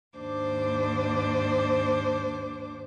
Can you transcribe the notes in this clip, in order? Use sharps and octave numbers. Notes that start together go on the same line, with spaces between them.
D#2 G#2 D4 C5 D6